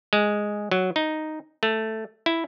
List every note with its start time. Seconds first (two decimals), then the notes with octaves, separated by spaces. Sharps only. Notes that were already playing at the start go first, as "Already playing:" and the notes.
0.13 G#3
0.71 F#3
0.96 D#4
1.63 A3
2.26 E4